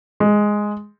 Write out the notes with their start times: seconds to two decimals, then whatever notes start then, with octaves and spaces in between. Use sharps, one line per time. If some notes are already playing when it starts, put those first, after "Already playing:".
0.20 G#3